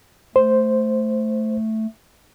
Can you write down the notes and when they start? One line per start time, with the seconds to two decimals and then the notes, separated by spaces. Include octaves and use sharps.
0.36 A3 C5